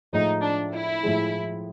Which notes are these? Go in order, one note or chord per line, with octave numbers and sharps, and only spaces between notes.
A2 F3 G#3 D#4
D4
E4
A2 F3 G#3